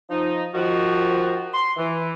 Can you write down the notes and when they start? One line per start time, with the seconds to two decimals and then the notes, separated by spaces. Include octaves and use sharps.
0.10 F3 D#4
0.54 D#3 F3 F#4
1.54 C6
1.77 E3